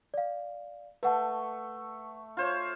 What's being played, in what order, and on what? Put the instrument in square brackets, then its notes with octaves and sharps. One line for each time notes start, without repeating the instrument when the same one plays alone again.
[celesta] D5 F5
[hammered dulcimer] A3 [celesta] B4 F#5 A5
[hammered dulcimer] F4 C5 C#5